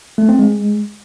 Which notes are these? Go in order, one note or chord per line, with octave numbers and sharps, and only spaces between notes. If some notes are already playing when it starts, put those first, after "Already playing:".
A3
C4
G#3